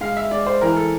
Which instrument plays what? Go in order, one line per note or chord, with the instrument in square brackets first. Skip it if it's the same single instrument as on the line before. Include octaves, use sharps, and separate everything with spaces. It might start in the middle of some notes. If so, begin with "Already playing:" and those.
[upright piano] G#3 F5
E5
G#3 D5
C5
E3 A#4
A4